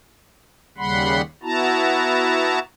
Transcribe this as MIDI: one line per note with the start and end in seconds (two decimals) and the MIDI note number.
0.78 1.22 39
0.78 1.22 49
0.78 1.22 55
0.78 1.22 78
0.78 1.22 83
0.78 1.22 84
1.43 2.59 59
1.43 2.59 64
1.43 2.59 66
1.43 2.59 81
1.43 2.59 82